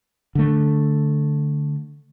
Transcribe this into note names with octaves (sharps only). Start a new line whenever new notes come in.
D3 A3